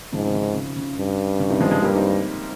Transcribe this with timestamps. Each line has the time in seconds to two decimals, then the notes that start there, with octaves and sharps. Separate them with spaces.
0.12 G#2 C#3 F3
0.23 C3 D#3
0.34 C#3
0.55 C#3
0.76 C#3
0.97 G2
1.39 C#3
1.50 C3 D#3
1.61 F3 G#3
1.71 F3 G#3
1.82 G2 G3 A#3
1.95 C4 D#4